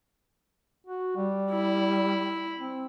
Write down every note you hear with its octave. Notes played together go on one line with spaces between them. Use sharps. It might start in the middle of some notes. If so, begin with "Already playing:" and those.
F#4
G3
E4
C4